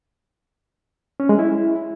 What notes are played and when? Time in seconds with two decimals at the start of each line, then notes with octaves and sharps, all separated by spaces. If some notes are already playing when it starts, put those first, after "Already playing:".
1.20 C#4
1.29 G#3
1.39 E4